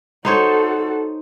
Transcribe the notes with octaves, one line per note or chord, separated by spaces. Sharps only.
D#4 F#4 A4 C5 C#5